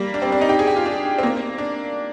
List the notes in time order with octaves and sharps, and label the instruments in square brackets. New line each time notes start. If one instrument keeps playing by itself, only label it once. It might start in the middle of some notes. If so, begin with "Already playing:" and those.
Already playing: [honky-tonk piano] G3 A#3
D4
C4
D4
D#4
G4
G#4
G4
F4
D4
C4
A#3
D4